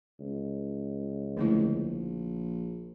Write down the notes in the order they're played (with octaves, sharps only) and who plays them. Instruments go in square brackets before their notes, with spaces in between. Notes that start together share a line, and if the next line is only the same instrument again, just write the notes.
[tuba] C#2
[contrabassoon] A#1 [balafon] D3 A3 E4